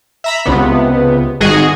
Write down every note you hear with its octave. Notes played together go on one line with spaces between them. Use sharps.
E5 A#5 B5
C#2 C3 B3
G#1 G#2 F#4 G#4 D#5